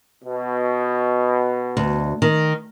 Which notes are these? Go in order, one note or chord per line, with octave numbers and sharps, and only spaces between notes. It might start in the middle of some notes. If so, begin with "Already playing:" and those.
B2
D2
D#3